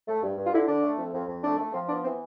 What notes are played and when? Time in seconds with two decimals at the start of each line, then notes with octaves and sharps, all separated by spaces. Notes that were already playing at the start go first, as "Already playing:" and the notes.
0.08 A3
0.23 G2
0.38 G2
0.45 F4
0.54 D3 E4
0.68 D3 D4
0.84 A3
0.98 F2
1.14 F2
1.29 F2
1.44 A3 D4
1.59 A3
1.74 F3 C4
1.89 B3 D4
2.04 E3 C4